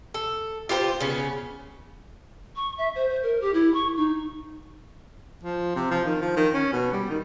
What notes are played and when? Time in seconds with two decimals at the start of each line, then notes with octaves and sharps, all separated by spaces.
0.14 A4
0.69 F4 G4 A#4 C5
1.00 C#3 B3 C#4
2.56 C#6
2.78 E5
2.95 C5
3.09 C5
3.23 A#4
3.41 G4
3.54 E4
3.74 C#6
3.97 D#4
5.44 F3
5.76 C3
5.91 F3
6.06 D#3
6.21 F3
6.37 D#3
6.54 C#4
6.73 B2
6.93 G3
7.10 D#3